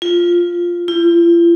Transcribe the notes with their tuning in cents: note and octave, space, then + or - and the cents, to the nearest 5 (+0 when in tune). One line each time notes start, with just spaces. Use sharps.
F4 +0
F4 -45